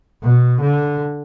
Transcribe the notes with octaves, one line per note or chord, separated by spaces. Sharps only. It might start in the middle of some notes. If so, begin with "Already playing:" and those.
B2
D3